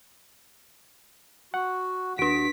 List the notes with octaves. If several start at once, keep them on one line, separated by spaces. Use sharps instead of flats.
F#4 F#5
D#2 D4 F#4 B6 D7